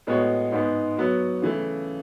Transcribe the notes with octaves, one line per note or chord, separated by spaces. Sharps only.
A2 G#3 B3 F#4 C#5
G#2 G#3 B3
F#3 B3 F#4
C#3 E3 A3